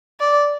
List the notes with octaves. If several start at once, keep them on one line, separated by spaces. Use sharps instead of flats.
D5